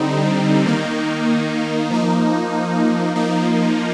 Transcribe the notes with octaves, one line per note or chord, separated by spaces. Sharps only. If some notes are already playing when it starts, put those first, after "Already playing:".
Already playing: D3 G3 C4 D#4
D#3 A#3 D#4
F3 A#3 D#4
F3 A#3 D#4